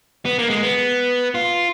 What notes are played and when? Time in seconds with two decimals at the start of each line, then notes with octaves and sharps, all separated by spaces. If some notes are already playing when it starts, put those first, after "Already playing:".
0.25 B3
0.39 A#3
0.50 G#3
0.63 B3
1.35 F4